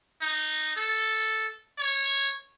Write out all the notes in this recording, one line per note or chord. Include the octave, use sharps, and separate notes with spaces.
D#4
A4
C#5